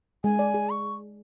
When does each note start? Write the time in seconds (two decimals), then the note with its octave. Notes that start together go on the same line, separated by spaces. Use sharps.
0.24 G#3 G#5
0.39 D5
0.54 G#4
0.70 C#6